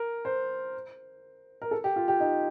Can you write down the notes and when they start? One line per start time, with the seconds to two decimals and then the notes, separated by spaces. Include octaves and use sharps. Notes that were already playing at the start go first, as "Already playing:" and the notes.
Already playing: A#4
0.25 C5
1.62 A#4
1.71 A4
1.84 G4
1.96 F4
2.08 G4
2.20 D#4